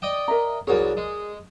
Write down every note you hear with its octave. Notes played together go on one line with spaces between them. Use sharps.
D5 D#5 G5
A#4 E5 A#5
C2 F#4 G#4 A#4 C#5 D5
G#3